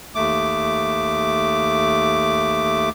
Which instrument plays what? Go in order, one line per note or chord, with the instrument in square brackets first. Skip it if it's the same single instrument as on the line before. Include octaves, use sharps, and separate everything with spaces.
[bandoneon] D#2 A3 D6